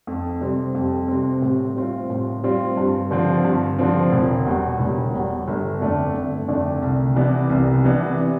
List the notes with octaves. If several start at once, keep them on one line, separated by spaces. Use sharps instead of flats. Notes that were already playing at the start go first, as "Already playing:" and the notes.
F2
C3 G3 C4
F2
C3 G3 C4
A2
G3 C4 F4
A2
G3 C4 F4
G2
D3 F3 C4
G2
D3 F3 C4
E1
E2 B2 G3
E1
E2 B2 G3
G1
F2 D3 A3 D4
G1
F2 D3 A3 D4
C2
C3 E3 B3 D4
C2
C3 E3 B3 D4